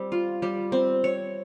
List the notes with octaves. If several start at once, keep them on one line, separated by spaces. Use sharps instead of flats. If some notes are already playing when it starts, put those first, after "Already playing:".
Already playing: G3 C4
F4
G3
C4
C#5